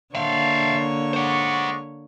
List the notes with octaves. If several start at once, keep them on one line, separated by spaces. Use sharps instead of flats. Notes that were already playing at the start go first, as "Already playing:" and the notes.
D3 A#3 C5 C#5 E5 F5 A5
G#3 C5 D5 F#5 C#6